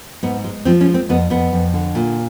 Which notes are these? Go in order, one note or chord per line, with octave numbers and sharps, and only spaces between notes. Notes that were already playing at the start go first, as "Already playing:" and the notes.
G#2 B3
G#3
F3 C4
C#4
G#3
C4
F2 B3
F2 B3
F2
D3
A#2